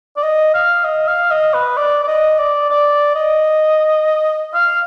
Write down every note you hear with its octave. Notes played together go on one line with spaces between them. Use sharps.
D5
D#5
F5
D#5
F5
D#5
B4
D5
D5
D#5
D5
D5
D#5
F5